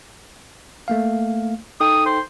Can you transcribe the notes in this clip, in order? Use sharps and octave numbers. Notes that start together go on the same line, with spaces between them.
A3 A#3 F5
D#4 A4 G5 D#6
C5